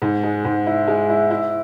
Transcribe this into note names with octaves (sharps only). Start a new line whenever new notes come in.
G#2
G#3
G#2
E4
G#3
E4
E4